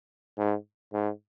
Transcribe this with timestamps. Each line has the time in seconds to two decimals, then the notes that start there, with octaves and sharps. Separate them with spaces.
0.37 G#2
0.93 G#2